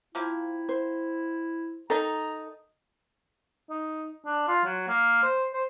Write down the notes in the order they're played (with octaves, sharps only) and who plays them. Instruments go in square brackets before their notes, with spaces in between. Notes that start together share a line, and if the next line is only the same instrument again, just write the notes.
[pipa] F3 A#3 C4 [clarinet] E4
[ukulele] C5
[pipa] D#3 D#4 [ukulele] A4 [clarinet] A#5
[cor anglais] D#4
D4
F4
F#3
A#3
C5
C5